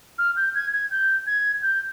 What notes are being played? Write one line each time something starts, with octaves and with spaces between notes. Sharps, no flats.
F6
G6
G#6
G#6
G6
G#6
G6